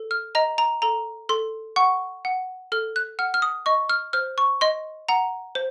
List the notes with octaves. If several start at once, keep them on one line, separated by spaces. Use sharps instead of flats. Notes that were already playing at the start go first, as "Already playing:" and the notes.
Already playing: A4
F6
D#5 A#5
A#5
A4 A#5
A4 C6
F#5 C#6
F#5
A4 F6
F#6
F#5 F6
F6
D#6
D#5 C#6
F6
C5 F6
C#6
D#5 C6
F#5 A#5
C5